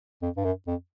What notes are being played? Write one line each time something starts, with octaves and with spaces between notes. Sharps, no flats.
F2
G2
F#2
F2